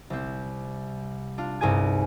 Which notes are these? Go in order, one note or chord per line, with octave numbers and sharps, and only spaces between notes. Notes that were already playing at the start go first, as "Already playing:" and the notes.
C2 C4
D4 F4
C2 G2 D#4 G#4 G#5 G#6